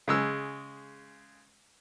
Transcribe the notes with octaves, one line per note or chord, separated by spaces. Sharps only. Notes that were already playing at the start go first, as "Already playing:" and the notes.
C#3 G#3 E6